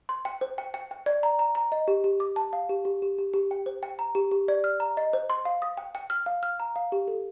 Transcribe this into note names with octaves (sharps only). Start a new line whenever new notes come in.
C6
G5
C5
G5
G5
G5
D5
A#5
A#5
A#5
D#5
G4
G4
D6
A5
F5
G4
G4
G4
G4
G4
G5
C5
G5
A#5
G4
G4
D5
F6
A#5
D#5
C5
C6
F5
D#6
G5
G5
F6
F5
F6
A#5
F5
G4
A4